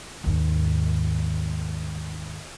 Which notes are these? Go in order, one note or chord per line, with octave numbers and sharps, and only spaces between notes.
D#2 G#2